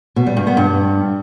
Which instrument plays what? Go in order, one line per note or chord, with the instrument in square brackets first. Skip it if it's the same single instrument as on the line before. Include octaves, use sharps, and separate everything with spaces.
[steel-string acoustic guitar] B2
G3
G2
B3
G2